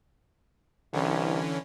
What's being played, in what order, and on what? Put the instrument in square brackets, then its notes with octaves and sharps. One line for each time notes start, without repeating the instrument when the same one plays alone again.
[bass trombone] C2 [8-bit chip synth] D3 E3 C#4